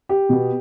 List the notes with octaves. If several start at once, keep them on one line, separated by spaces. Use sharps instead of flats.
G4
B2 B3